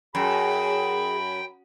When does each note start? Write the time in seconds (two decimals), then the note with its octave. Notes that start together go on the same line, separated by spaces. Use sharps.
0.15 F#2 G#4 G5 B5